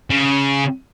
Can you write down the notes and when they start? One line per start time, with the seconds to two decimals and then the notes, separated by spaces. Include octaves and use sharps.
0.10 C#3